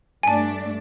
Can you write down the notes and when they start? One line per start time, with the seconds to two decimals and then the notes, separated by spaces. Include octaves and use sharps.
0.23 G2 A3 D4 G#5 A5